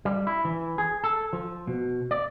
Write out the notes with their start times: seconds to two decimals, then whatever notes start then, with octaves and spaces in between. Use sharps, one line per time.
0.05 G3
0.27 E4
0.45 E3
0.78 G#4
1.04 A4
1.33 F3
1.68 B2
2.11 D5